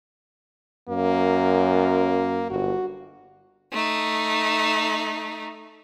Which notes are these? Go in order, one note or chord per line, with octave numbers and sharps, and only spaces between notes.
F#2 A#3
G1 F#4
A3 D#4